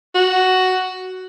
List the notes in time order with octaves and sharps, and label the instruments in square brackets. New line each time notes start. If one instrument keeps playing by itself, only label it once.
[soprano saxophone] F#4